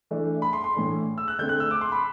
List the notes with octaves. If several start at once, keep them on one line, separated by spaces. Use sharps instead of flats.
E3 A3 D4
B5
C6
C6
A2 E3 A3 D4
E6
F#6
D3 A3 C4 G6
F#6
E6
D6
C6
B5